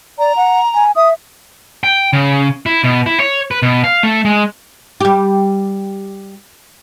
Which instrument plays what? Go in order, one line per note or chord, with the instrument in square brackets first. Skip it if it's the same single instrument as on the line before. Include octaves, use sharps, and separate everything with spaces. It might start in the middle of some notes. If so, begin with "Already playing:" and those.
[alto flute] D5 [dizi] A#5
[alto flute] F#5
G#5
[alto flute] E5 [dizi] D#6
[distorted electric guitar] G5
C#3
E4
B2
E4
C#5
B4
B2
F5
A3
G#3
[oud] G3 G4